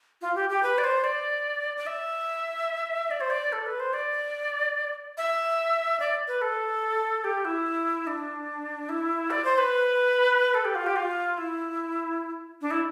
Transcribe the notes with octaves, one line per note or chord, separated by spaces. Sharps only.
F4
G4
G4
B4
D5
C5
D5
D5
E5
D5
C5
D5
A4
B4
C5
D5
E5
D5
B4
A4
G4
E4
D4
E4
D5
C5
B4
A4
G4
F4
G4
F4
E4
D4
E4